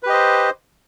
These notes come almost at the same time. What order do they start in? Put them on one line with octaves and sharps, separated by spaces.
B4 G4 D#5 C5